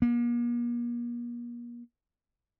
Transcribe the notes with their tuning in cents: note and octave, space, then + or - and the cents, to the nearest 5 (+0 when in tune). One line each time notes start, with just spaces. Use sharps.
A#3 +40